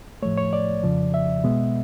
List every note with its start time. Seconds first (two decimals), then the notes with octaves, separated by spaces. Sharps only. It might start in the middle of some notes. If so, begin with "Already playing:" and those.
0.22 A2 F3 A3 C#5
0.38 C#5
0.53 D5
0.84 F2 C#3 F3
1.14 E5
1.44 B2 G#3 B3